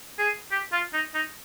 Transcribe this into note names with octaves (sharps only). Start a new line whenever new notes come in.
G#4
G4
F4
D#4
D#4